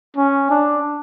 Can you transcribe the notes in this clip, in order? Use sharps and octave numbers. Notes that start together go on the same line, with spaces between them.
C#4
D4